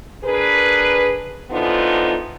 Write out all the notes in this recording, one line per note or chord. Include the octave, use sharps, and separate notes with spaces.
D4 G#4 A#4 B4
D3 E3 F3 B3 D#4 F4